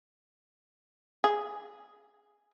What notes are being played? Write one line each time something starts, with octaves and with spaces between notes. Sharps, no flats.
G#4